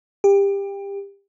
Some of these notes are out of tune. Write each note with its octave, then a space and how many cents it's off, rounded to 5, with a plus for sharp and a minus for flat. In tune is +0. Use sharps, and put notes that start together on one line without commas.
G4 +25